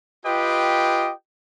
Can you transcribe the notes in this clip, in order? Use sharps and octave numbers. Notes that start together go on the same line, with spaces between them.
F4 G4 B4 D#5 G5